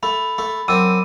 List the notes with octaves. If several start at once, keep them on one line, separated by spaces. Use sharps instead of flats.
A3 B5
A3
F#2 C4 D6 E6 D#7